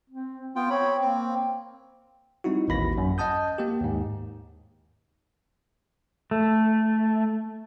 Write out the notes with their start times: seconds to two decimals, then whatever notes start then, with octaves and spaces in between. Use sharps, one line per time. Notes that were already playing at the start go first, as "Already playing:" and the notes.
0.09 C4
0.56 B3 F4 G5
0.70 C4 C#5 B5
1.01 A#3 C4
2.44 G3 C4 D#4 E4 F#4
2.68 A1 D#2 B5 A#6
2.98 F#2
3.18 D#5 F#5 A5 D#6 G6
3.58 A#3 G4
3.80 D#2 G#2
6.31 A3